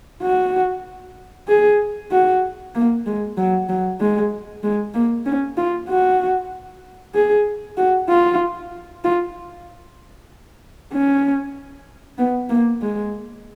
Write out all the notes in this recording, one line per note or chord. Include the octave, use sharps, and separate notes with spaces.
F#4
G#4
F#4
A#3
G#3
F#3
F#3
G#3
G#3
A#3
C#4
F4
F#4
G#4
F#4
F4
F4
C#4
B3
A#3
G#3